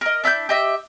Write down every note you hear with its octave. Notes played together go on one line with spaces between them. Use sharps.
A#4 D#5
D4 E4 E6 G6
G4 D#5 E5